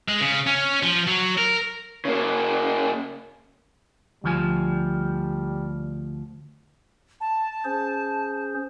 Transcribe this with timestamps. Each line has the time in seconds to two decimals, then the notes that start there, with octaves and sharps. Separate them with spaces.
0.08 G#3
0.21 C#3
0.47 C#4
0.83 F3
1.07 F#3
1.38 A#4
2.05 C#3 A#3
4.24 D2 F3 G3 G#5
7.21 A5
7.65 C#4 G#4 C5